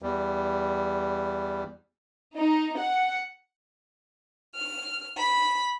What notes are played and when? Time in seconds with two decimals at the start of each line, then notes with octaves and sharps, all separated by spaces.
0.02 E2 G3
2.36 D#4
2.78 F#5
4.55 F6
5.17 B5